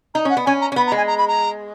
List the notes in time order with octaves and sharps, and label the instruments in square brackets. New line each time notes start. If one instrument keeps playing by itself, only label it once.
[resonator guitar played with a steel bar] D#4 [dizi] A#5
[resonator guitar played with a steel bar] C#4 [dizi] F#5
[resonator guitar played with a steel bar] B3
[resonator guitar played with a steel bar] C#4 [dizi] G#5
[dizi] A#5
[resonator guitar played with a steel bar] C#4
[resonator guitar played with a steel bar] B3 [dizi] B5
[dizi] A#5
[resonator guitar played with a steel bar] G#3
[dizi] G#5
A#5
B5
A#5